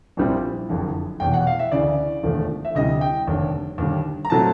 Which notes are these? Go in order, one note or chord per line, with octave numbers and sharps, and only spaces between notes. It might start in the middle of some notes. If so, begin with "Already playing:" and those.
A#1 A#2 G3 C4 E4
F#1 F2 D3
F1 E2 B2 G5
F#5
F5
E5
D2 C#3 E3 D5
E1 D#2 D3 F3 A3
E5
D2 C3 E3 G3 D#5
G5
F1 D#2 D3
D#2 D3 G3
A#5
A#2 F#3 A3 C4 A5